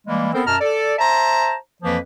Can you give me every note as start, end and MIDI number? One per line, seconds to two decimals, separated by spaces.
0.07 0.33 52
0.07 0.33 55
0.07 0.33 56
0.07 0.33 58
0.33 0.42 59
0.33 0.42 60
0.33 0.42 69
0.33 0.42 70
0.33 0.42 72
0.46 0.56 42
0.46 0.56 47
0.46 0.56 81
0.46 0.56 82
0.46 0.56 89
0.61 0.94 69
0.61 0.94 74
0.98 1.55 72
0.98 1.55 76
0.98 1.55 81
0.98 1.55 82
1.83 1.98 41
1.83 1.98 52
1.83 1.98 53
1.83 1.98 58
1.83 1.98 71